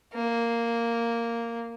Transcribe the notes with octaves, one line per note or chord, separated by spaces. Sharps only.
A#3